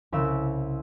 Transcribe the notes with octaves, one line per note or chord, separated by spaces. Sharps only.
C2 C#3 E6